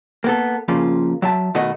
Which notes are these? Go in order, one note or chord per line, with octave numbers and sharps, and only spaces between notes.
A#3 B3 A4
C#3 F3 A#3 C#4 F4
F#3 E5 A5
B2 D#3 A3 F#4 D#5